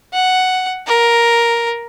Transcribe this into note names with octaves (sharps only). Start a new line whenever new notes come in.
F#5
A#4